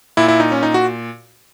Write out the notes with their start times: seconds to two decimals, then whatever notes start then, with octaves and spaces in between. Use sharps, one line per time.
0.17 A#2 E4
0.28 E4
0.40 D#4
0.52 C#4
0.63 D#4
0.74 F#4